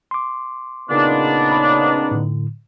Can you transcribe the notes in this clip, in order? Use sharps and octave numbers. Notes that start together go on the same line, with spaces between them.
C6 D6
A#2 C#3 B3 D4 D#4
B5
A2 D3